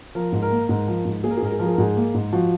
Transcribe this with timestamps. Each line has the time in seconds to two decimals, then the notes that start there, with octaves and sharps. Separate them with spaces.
0.15 F3 A#4
0.32 G#2
0.42 A#4
0.51 A#3
0.69 G#2 A#4
0.88 F3
1.05 G#2
1.24 A#3 G#4
1.31 A#4
1.37 G#4
1.42 G#2 A#4
1.52 G#4
1.59 F3 A#4
1.66 G#4
1.73 A#4
1.78 G#2 G#4
1.96 A#3
2.14 G#2
2.33 F3 F#4